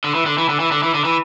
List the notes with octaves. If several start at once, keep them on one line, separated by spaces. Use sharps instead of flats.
D3
E3
D3
E3
D3
E3
D3
E3
D3
E3